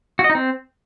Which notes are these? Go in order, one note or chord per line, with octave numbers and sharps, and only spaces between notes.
F#4
D#5
D#4
C4